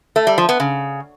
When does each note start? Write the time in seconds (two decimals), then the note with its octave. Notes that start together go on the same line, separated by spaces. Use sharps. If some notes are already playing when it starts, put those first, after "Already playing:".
0.16 A3
0.27 G3
0.38 F3
0.49 B3
0.60 C#3